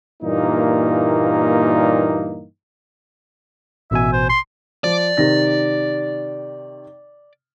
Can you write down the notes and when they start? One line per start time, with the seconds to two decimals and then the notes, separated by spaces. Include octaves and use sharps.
0.23 G2 A#2 E3 G3 A#3 D#4
3.91 A1 B2 E5 G#5
4.13 C5
4.29 C6
4.84 F3 D5
5.17 C3 D#3 A#6